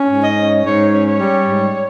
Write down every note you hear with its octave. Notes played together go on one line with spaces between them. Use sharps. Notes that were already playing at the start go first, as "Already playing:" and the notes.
Already playing: C#4
G#2
D#5
C#4
G#2 C#5
C#4
C#5
G3
G#2